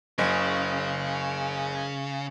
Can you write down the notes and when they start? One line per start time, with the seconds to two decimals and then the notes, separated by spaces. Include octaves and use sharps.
0.18 F#1 C#3